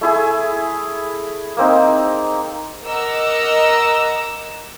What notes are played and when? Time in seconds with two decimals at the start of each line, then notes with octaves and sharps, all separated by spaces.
0.01 A3 E4 G#4
1.57 A#3 C4 D#4
2.85 A#4 D#5 F#5 A#5 D6 E6